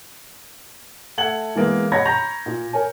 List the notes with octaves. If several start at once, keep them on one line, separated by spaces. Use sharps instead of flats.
A3 F#5 G#6 F#7
E3 G#3 A#3 B3
C#5 D#5 F#5 B5 G#6 A#6
A#5 B5 C#6 G6 A#6 F7
A#2
A#4 C#5 G#5